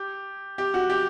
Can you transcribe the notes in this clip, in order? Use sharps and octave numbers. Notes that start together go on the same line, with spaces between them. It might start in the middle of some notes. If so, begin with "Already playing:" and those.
Already playing: G4
G4
F#4
G4